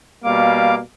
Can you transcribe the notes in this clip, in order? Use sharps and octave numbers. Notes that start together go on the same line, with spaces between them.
B2 G3 A#3 F5 D6